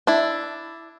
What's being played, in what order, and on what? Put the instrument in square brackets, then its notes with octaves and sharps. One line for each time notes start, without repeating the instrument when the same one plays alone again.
[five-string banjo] D4 E4